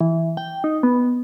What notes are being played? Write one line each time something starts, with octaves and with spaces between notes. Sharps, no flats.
E3
G5
D#4
B3